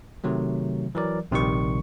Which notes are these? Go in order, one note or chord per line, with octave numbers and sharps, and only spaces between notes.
C3 D#3 F#3 A3
E3 F#3 A#4 D5
A#1 C3 D#3 G3 C#6